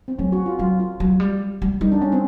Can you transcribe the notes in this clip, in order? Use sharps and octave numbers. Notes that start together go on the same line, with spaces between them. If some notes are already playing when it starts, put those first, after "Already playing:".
C4
F#3 C#4
F#4
F4
F#3 F4
F4
F#3
G3
G3
G3 D#4
D4
C#4
C4